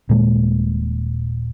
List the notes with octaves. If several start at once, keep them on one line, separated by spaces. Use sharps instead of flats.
D#1 A#2 G#3 A#3